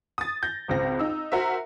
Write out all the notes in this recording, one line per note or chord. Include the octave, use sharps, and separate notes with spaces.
D#6 A6
G6 A#6
G#1 C#2 C4 A#6
D#4 E6
F#4 A#4 C5 E5